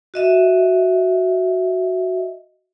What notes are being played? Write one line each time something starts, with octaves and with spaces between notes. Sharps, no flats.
F#4 D#5 E5